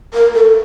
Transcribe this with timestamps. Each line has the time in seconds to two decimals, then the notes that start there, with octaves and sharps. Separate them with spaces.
0.14 A#4
0.35 A4